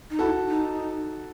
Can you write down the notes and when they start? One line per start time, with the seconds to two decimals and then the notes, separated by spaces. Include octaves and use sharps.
0.10 D#4
0.19 E4 F#4 A4
0.48 D#4